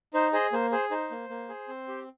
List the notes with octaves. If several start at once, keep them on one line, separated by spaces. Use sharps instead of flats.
D#4 C5
G#4 C5 D#5
A#3 C5
G#4 C5
D#4 C5
A#3
A#3
G#4
C4
G4